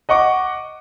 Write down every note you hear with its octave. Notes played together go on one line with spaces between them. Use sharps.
D#5 F#5 C#6 D6